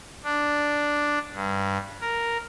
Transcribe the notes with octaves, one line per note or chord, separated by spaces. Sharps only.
D4
G2
A#4